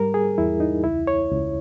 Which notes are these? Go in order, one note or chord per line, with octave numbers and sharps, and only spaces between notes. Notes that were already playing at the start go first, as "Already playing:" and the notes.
Already playing: G#2 G3 A#4
G#4
E2 E4
D#4
C#2 E4
C#5
C#2